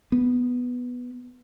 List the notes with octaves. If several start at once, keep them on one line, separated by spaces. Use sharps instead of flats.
B3